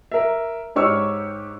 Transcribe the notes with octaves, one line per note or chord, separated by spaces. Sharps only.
A#4 E5
G#2 G4 C#5 C#6 E6 F6